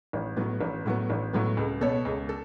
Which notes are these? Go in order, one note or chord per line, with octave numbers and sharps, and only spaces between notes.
A1
A2 F#3 B3
A1
A2 F#3 B3
A1
A2 F#3 B3
C#2
B2 B3 A4 C#5
C#2
A4